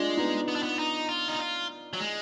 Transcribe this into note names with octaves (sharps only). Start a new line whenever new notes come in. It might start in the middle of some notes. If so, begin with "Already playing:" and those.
Already playing: G#3 D4 F4
B3 D#4
B3
D4
B3
D#4
F4
D#4
F4
F#3
G#3